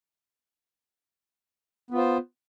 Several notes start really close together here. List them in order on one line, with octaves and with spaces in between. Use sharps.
B3 F4 C5